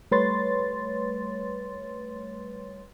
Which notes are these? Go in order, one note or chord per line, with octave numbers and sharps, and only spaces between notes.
G3 A3 B4 C#5 C6 A6